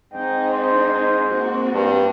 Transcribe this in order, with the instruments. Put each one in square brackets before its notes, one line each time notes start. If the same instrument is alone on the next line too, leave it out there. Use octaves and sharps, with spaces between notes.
[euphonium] G#2 [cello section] C4 D#4 [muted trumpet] G5
[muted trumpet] C5
[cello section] A#3 C4 F#4
[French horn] G2